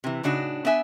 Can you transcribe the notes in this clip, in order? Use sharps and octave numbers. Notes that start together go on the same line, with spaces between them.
C3 E3
A2 C#3 D4 D#4 F#4
B3 D4 E5 G#5